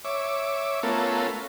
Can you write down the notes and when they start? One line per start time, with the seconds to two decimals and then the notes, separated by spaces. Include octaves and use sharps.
0.05 C#5 E5 D6
0.83 A3 B3 C#4 F4 A4 A#4